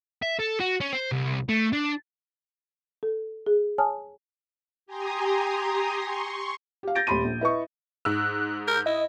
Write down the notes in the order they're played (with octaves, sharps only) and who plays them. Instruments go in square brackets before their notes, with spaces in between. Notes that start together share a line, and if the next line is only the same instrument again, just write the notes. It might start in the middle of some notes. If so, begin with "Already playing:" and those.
[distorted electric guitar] E5
A4
F#4
C#4
C5
C2
A3
D4
[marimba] A4
G#4
C#5 G#5 A5 D#6 F6
[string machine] G4 G#5 A#5 C6 D#6
C6 C#6
[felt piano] G4 F5
G6 A6 A#6 D7
D#1 A3 G4 B5 C6 D#7
A#1
E4 B4 D#5 C#6
[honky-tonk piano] G#2 E6 [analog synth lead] F#6
[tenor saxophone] A#4 [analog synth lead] G6
[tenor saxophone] E4 [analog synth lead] D#5